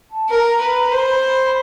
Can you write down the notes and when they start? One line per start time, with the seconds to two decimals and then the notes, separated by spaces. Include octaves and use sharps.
0.09 A5
0.29 A#4 A#5
0.61 B4
0.92 C5 B5